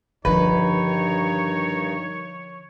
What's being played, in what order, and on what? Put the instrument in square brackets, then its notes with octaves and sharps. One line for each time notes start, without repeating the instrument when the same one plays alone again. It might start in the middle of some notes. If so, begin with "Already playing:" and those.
[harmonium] G2 D#3 D#4 [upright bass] D3 F3 [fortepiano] B4 [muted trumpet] C#5